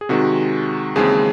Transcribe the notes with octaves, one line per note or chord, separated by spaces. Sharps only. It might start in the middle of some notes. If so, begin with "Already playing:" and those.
G#4
C3 D#3 G#3 F#4
D#2 C#3 E3 G#3 C4 G#4